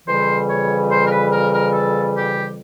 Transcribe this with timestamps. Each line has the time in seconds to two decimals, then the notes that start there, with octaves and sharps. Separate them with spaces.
0.06 F2 C#3 E3 G3 C5
0.48 C#5
0.90 C5
1.06 A#4
1.11 B4
1.32 A#4
1.52 A#4
1.72 A4
2.14 G4